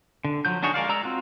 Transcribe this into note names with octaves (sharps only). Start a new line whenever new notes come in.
D3
F3 F#3 G6
D4 D#4 F#4 G#4 C#5
G#3 A#4 D5 F5
G#3 D5 A#5 E6
C4 F4 F#4